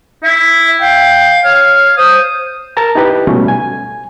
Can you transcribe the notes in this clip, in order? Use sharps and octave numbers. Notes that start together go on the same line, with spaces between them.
E4 E5
F5 G5
C#5 F5
C5 D#6
A#4 A5 A#5
D#4 E4 G4 B4
B2 F#3 G3 A3 C#4
G#5